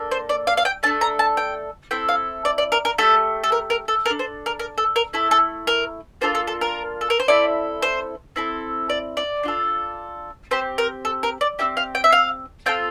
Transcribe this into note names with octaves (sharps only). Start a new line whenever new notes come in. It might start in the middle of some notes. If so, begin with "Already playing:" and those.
Already playing: A#3 D4 A4
C5
D5
F5
F5
G5
A3 D4 A4 A5
A#5
A5
G5
C4 E4 A4 G5
F5
D5
D5
A#4
A#4
A3 E4 G4 A4
A4
A#4
A#4
A4
D4 A4 A#4
C5
A#4
A#4
A4
A#4
A3 E4 A4
A4
A#4
A#3 D4 F4 A4 C5
A4
A4
A#4
A4
A#4
C5
C4 E4 A4 D5
C5
C4 E4 A4
D5
D5
D4 F4 A4
C4 G4 C5
A#4
A4
A#4
D5
C4 E4 G4 E5
F5
G5
E5
F5
C4 F4 A4 G5